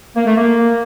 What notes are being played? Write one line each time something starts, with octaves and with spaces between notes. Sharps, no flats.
A#3
A3
A#3